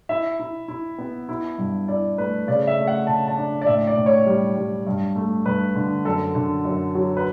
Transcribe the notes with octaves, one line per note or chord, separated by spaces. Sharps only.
E4 E5
E4
E4
B3
E4
G2
E4 D5
A3 B4
C#3 D5
E5
A3
F#5
C#3 A5
A5
D4
D5
A2 E5
D5
A2
C#5
G3
G3
G2
A3
G2 B4
D3
F#2 A4
D3
F#2
F#3
B4